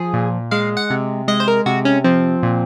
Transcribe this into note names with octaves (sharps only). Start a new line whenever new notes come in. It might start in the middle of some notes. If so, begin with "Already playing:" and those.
Already playing: F3 G#4
A#2
G#3 F5
F#5
C3
G#3 D#5
C5
A#4
C3 F#4
C#4
F3 C4
A#2